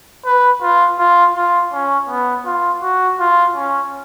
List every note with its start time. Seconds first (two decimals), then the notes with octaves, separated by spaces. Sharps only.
0.25 B4
0.62 F4
0.99 F4
1.35 F4
1.72 C#4
2.09 B3
2.45 F4
2.82 F#4
3.20 F4
3.56 C#4